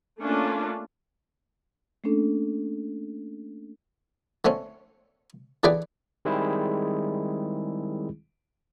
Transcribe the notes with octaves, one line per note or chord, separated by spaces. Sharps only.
A3 A#3 C#4 D4 F4
A3 A#3 C#4 D4 A4
D3 A3 C4 C#4
D3 E3 G#4 B4 D5 G5
D#3 G3 G#3 C4 E4 G#4